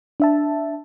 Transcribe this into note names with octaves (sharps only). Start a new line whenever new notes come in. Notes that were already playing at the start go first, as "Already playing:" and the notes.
D4 E5 A5